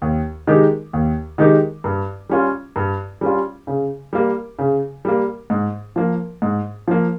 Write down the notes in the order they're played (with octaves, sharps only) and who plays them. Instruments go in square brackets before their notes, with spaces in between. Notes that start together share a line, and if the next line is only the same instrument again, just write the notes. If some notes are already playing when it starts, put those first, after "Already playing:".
[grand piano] D#2
D#3 G#3 D#4 G4
D#2
D#3 G#3 D#4 G4
G2
G3 C#4 F4
G2
G3 C#4 F4
C#3
G3 A#3
C#3
G3 A#3
G#2
F3 A#3
G#2
F3 A#3